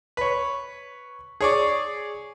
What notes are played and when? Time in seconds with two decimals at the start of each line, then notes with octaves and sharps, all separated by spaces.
0.17 B4 C#5
1.40 G#4 C#5 D5